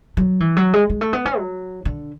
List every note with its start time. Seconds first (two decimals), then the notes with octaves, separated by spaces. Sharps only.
0.17 F#3
0.40 E3
0.57 F#3
0.73 G#3
0.90 G#3
1.01 A3
1.13 B3
1.25 C#4
1.38 F#3
1.85 D3